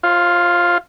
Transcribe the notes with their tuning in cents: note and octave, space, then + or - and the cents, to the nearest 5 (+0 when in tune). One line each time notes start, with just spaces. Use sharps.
F4 +0 C5 +35